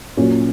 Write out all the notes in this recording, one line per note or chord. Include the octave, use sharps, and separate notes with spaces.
A#2 F#3 C#4